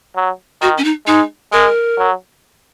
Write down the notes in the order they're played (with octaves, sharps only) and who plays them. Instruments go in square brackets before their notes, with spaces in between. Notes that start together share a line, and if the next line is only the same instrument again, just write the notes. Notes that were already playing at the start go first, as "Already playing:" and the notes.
[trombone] F#3
[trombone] D#3 [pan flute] F#4
[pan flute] C#4
D#4
[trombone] G#3 [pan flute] D#4
[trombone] G#3 [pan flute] A#4
[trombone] F#3